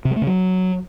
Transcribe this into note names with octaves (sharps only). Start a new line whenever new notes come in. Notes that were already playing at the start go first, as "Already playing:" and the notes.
C3
G3
A3
C#3
F#3